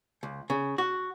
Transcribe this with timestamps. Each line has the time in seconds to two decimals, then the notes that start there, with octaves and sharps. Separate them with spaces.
0.23 C#2
0.50 C#3
0.78 F#4